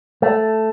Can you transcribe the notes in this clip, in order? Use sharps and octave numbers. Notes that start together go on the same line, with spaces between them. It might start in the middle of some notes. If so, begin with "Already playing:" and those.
A3